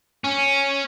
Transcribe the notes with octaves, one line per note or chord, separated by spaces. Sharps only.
C#4